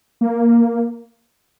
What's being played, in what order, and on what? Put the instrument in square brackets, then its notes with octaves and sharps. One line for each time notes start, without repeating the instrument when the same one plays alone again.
[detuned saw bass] A#3